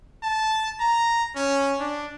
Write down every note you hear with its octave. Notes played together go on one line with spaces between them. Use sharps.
A5
A#5
C#4
D4